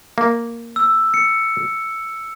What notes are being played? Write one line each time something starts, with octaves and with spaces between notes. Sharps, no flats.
A#3
E6
C#7